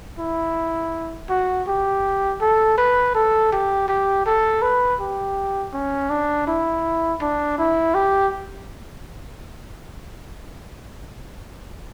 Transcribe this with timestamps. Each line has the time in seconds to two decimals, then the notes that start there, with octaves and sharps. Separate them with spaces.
0.19 E4
1.30 F#4
1.68 G4
2.41 A4
2.78 B4
3.15 A4
3.53 G4
3.88 G4
4.26 A4
4.62 B4
5.00 G4
5.74 C#4
6.10 D4
6.48 E4
7.22 D4
7.58 E4
7.94 G4